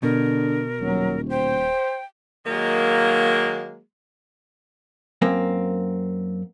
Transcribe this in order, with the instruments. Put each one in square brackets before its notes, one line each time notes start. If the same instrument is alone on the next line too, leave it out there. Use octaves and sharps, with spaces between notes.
[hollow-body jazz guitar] B2 [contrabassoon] D3 [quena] A#4
[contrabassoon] D#1 [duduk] F#3
[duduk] C5 [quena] G5
[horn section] D#3 F#3 G#3 A#3
[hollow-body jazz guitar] F#2 A#3 C4